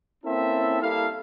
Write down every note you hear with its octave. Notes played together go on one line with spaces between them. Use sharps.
A#3 C4 C#4 E4 A4 E5
G3 A#3 E4 A4 F5